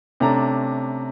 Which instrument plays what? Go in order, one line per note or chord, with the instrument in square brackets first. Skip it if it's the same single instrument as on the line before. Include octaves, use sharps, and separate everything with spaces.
[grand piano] C3 A3 C#4 D4 A#5